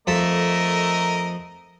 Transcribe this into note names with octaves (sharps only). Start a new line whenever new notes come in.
F2 A3 A#4 D#5 E5 A5